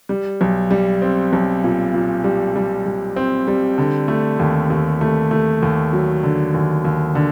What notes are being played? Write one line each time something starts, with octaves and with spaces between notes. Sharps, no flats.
G3
B1
G3
C4
B1
A#2
A#2
G3
G3
G3
C4
G3
D3
A3
D#2
D#2
A3
A3
D#2
F#3
D3
D#2
D#2
D3